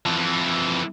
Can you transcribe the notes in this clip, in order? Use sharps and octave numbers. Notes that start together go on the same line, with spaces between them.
F2 E3